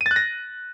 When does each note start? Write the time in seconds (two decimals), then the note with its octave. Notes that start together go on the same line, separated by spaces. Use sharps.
0.01 D#7
0.06 A6
0.11 F#6
0.16 A#6